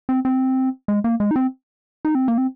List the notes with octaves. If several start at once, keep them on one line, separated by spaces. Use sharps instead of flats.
C4
C4
G#3
A#3
G#3
D#4
C4
D#4
C4
A#3
C4